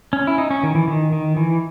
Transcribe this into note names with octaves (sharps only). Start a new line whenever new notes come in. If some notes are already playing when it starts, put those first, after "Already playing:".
C#4
E4
D#4
C#4
D#3
E3
D#3
D#3
E3